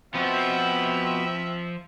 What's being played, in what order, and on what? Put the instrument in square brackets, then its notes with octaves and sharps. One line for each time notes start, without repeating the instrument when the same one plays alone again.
[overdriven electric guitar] F3 [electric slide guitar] B3 F#4 [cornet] C4 [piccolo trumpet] E5